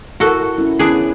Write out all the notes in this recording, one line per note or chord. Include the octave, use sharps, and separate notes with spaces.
E4 F#4 A4 A#4
C#4 E4
B3 C#4 D4 E4 G#4